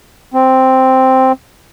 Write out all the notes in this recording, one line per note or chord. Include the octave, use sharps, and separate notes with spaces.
C4